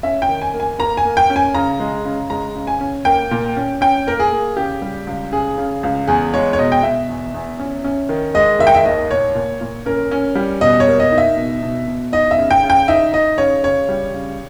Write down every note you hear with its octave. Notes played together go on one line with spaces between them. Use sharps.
C#4 E5
G5
D#3
G#5
A#3
G#5
A#3 A#5
G#5
A#3
G5
C#4
G#5
C#3 A#5
G#3
C#3
G#3 A#5
C#3
G#5
C#4
A#3 G5
A#2
C#4
C#4 G5
A#3 A#4
G#4
A#3
C#3 G4
G3
C#2
C#3 G#4
C#3
C#2
E2 G#4
G#3 C#5
C#5
B2 D#5
G5
B2 E5
E2
E2
C#4
C#4
D#3
G#3 D#5
D#3 E5
G5
E5
D#2 D#5
A#2 C#5
A#2
A#2
C#4 A#4
C#4
G3
B2 D#5
C#5
A#3
D#5
D#4
E5
B2
B2
B2
D#4 D#5
E5
C#3
G5
C#3
G5
D#4 E5
D#4 D#5
C#3 C#5
C#3 C#5
G3
C#3